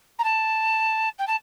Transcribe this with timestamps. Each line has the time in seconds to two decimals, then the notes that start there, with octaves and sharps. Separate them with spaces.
0.18 A#5
0.24 A5
1.18 G5
1.27 A5